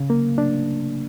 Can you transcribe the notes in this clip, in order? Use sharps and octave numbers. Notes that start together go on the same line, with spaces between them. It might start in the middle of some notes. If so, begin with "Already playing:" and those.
Already playing: C#3
A#3
D4